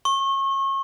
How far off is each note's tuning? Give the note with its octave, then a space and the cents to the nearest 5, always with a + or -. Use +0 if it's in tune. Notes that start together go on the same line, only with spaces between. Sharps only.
C#6 -30